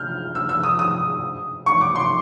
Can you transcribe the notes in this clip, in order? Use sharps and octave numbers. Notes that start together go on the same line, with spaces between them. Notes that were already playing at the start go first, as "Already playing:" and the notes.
Already playing: F6 G6
E6
E6
D#6
D#6
C#6
D6
C6